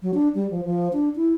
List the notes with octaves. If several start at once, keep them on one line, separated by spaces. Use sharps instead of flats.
F#3
D4
G3
F3
F3
D4
E4